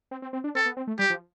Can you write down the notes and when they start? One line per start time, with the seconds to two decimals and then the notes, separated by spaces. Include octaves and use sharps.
0.11 C4
0.22 C4
0.33 C4
0.44 D4
0.55 C4 A4
0.66 B3
0.77 C4
0.87 A3
0.99 G3 G4
1.10 F3